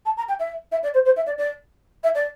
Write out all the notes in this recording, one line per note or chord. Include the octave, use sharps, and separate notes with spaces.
A5
A#5
G5
E5
E5
D5
C5
C5
E5
D5
D5
E5
D5